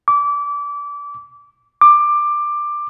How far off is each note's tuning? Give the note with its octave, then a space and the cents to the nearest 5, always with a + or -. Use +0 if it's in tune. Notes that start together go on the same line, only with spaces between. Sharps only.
D6 -25
D6 +15